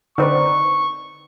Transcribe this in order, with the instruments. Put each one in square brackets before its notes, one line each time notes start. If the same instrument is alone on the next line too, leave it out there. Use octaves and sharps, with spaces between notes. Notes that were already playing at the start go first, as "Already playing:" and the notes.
[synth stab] D3 C4 [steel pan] D#4 B4 D5 [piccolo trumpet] C#6